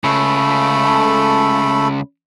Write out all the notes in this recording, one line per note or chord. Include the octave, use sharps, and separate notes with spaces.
C#2 C#3 A3 A4 B5